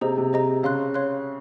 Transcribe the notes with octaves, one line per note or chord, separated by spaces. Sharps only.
C3 G#4 C5 D#5 A#5
C3
G#4 C5 D#5 A#5
C#3 C#5 F5 C6 F#6
C#5 F5 C6 F#6